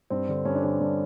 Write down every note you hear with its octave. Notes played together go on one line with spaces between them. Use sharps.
G2 C4
D3
G2 C#4
D4
D3 C#4
G2